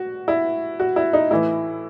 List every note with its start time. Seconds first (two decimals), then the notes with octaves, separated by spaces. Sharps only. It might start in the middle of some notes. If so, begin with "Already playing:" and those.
Already playing: F#4
0.28 E4
0.80 F#4
0.96 E4
1.13 D#4
1.31 A2 E3 E4